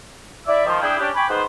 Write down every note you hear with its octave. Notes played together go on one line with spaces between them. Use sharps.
E4 D5 E5
D#3 F3
D4 E4 G#4 G5
C#4 D4 G4
G5 G#5 B5 C#6 D6
G#2 D#3 B3 B4 C5